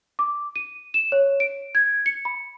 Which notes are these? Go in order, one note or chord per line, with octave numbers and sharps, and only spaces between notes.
D6
D#7
E7
C#5
D7
G#6
C#7
B5